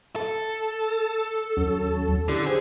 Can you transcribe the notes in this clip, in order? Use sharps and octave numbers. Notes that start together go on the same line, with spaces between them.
A4
D#2 F#3 C#4
D3 E4 G4
G#4 C5 G5